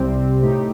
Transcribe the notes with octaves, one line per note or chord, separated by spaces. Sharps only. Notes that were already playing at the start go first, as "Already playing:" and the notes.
Already playing: C2 C3 G3 C4 G4
A2 A3 D#4 G4